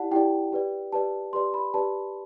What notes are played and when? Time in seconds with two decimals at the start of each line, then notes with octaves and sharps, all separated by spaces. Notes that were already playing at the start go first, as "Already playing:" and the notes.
Already playing: E4 G4 D5 F#5 A5
0.11 E4 G4 D5 G5
0.53 G4 B4 D5
0.92 G4 B4 D5 A5
1.33 G4 B4 D5 C6
1.54 B5
1.74 G4 B4 D5 A5